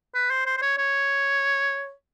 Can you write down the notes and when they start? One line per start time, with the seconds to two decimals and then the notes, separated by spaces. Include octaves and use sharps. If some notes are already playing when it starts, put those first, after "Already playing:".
0.14 B4
0.30 C5
0.46 C5
0.57 C5
0.62 C#5
0.78 C#5